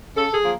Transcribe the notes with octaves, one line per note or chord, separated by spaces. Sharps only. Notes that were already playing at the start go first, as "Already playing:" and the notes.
C#3 A4
G#4
F3 A#3